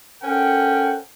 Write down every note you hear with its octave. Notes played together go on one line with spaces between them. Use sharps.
C#4 A4 A#4 C5 F#5 G5